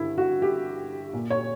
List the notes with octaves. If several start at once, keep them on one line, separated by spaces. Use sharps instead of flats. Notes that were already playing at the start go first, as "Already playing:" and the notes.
Already playing: G2 D3 E4
F#4
G4
A#2
C#5